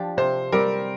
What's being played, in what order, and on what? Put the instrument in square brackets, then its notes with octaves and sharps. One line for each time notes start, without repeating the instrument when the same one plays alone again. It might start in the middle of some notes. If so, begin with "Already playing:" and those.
Already playing: [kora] F3 D4 G4
[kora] C3 [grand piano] C5
[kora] G3 C4 G4 [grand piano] A#4